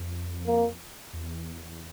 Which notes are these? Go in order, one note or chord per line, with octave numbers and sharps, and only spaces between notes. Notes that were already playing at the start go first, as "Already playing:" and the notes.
Already playing: F2
A#3
E2